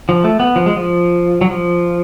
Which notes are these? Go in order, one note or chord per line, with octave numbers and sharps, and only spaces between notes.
F3
A3
B3
F3
G#3
F3
F#3
F3